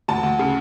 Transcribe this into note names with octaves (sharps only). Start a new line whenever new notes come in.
D2 A5
D2
C#3